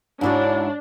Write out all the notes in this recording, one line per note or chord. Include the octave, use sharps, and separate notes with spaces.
G#2 D4 E4 F#4 C#5